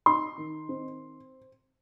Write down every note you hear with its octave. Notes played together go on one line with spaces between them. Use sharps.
D#4 C6
D#3
C4